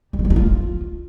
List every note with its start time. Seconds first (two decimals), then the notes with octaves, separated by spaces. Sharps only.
0.13 G3
0.19 G#3
0.25 G3
0.30 A3
0.36 F4